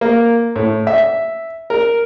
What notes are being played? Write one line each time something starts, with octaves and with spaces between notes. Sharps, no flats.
A#3
A2
E5
A#4